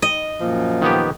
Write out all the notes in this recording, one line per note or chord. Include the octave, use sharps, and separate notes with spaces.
D#5
F#2 A#2 F3
D#3 B3 G4